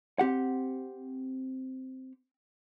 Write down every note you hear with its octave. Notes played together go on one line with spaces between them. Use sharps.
C4 G4 F#5